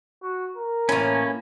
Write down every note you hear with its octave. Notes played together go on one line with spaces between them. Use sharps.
F#4
A#4
A2 E3 A#3 C#4